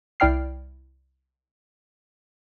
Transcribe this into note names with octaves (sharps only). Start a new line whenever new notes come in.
C2 E4 D5 G5 F6 C7